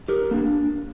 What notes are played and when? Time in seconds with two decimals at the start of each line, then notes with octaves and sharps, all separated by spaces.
0.08 G4 A#4
0.31 A#3 D4